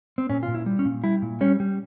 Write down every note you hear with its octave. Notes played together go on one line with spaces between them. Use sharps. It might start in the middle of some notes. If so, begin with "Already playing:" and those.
C4
A#2 C#4
F4
A#2
E4
G3
C#4
A#2
G3 E4
A#2
G3 C#4
G3